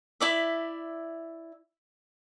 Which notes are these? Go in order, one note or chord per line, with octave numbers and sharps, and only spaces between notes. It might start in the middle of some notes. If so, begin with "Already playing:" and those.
E4 D5 E5